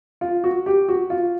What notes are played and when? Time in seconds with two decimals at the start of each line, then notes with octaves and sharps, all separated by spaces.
0.21 F4
0.44 F#4
0.66 G4
0.89 F#4
1.10 F4